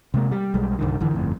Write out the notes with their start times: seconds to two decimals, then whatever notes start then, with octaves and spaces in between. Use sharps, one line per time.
0.14 C3 G#3 A#3
0.32 G3
0.54 B1 G3 G#3
0.78 C2 G2 D3 D#3
1.00 F#1 D3 E3
1.14 G1 F2 A2